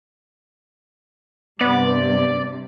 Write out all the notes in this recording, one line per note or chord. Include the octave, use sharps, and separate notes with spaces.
G2 C3 G3 B3 D5